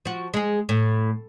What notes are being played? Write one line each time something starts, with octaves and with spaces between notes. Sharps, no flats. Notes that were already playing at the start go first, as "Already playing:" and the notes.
F3 F#4
G#3 G#4
A2